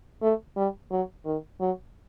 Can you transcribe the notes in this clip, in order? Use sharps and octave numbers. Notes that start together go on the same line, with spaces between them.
A3
G3
F#3
D#3
F#3